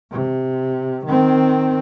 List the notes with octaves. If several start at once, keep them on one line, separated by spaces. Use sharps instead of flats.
C3
D#3 C4